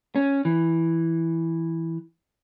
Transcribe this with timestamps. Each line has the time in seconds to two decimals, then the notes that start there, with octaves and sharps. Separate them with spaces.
0.16 C#4
0.45 E3